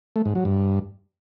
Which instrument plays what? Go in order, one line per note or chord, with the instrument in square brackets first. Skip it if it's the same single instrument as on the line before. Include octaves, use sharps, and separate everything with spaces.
[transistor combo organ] A3
G#2
F#3
G2